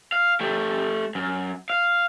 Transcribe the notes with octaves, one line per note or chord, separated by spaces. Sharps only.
F5
A3 G4
F#2
F5